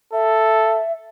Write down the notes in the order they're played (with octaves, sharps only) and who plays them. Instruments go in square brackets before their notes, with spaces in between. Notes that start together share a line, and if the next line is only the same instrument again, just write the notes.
[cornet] A4 [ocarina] E5